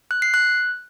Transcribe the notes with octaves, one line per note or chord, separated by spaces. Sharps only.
F#6
C7
F#6